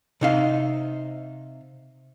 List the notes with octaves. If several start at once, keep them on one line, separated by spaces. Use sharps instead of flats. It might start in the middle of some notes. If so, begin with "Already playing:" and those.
C3 D#4 F5